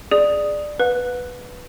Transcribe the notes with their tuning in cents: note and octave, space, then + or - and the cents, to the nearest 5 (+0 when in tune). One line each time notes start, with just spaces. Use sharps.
G#4 +0 D5 +15 D#6 +0
B4 +0 F#5 -40